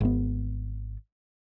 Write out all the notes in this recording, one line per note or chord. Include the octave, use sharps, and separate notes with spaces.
G#1 B3